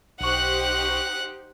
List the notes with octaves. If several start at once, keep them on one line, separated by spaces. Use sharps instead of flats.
B1 D#4 G4 C5 F#5 C#6 F#6